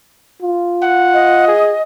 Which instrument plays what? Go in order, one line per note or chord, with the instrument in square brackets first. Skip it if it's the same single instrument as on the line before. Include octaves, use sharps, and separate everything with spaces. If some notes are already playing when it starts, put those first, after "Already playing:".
[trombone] F4
[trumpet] F#5
[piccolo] D#5
[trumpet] G#4